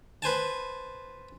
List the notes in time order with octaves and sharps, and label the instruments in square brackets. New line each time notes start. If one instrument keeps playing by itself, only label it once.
[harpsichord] B4 C5 G#5 A5